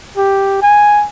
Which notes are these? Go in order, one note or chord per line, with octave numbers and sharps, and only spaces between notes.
G4
G#5